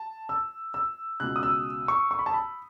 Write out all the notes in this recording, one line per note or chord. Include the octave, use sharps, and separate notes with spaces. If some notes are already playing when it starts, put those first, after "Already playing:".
Already playing: A5
E6
E6
C#2 B2 F#6
D#6
E6
C#6
C#6
B5
A5
B5